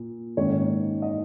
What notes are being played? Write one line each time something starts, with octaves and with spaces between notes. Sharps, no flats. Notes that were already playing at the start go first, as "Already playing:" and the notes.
Already playing: A#2
G#2 D#3 A#3 C#4 C#5
D#5